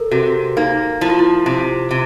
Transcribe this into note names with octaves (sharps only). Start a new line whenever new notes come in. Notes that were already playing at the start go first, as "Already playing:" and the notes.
Already playing: A4 A#4
C3 F#4
A#3 D#4
F3 E4
F4
E4
C3
C3